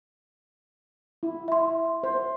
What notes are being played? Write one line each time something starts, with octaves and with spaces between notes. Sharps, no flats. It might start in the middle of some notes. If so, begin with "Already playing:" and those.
E4
E5 C6
C5